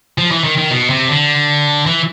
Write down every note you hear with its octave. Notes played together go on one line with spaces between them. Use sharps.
F3
E3
D#3
D#3
B2
C3
D3
E3